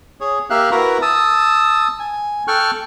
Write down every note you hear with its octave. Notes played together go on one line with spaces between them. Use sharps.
G#4 C#5
A#3 G4 E5 F5 F#6
E4 F#4 A#4 B4 A#5
A5 D#6 E6
G#5
A4 G5 C#6 F6 F#6